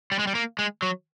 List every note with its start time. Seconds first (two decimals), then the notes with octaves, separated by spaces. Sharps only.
0.12 G3
0.19 G#3
0.27 G3
0.35 A#3
0.59 G#3
0.82 F#3